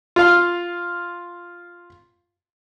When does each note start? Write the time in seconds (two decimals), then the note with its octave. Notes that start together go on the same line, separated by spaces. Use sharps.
0.16 F4 F5